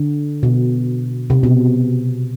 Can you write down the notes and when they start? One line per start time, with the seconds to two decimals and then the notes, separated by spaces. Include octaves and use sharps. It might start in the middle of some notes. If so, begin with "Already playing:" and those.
Already playing: D3
0.43 B2
1.30 C3
1.43 B2